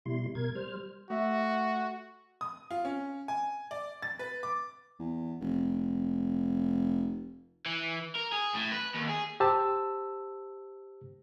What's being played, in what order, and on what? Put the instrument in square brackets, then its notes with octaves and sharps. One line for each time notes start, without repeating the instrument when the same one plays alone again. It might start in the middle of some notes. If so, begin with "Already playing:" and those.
[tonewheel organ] B2 G3 E4 C6
B2 A#4 G#6
G3 C5 F6
[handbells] A3 E5 [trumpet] F#4
[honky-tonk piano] D#6
F4
C#4
G#5
D5
A6
B4
D6
[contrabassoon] E2
F1
[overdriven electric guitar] E3
A#4
G#4
A2
B4
D#2
G#4
[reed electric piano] G4 C5 A5 E6